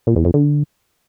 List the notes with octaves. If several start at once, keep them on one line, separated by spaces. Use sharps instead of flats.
A#2
E2
F2
D3